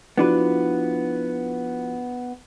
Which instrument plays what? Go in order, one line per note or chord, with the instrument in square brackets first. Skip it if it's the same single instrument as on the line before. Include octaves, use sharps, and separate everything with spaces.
[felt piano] F3 E4 F#4 [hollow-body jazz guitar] B3 D4 B4